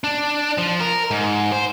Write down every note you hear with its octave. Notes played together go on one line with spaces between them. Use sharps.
D4
F3
A#4
G#2
C5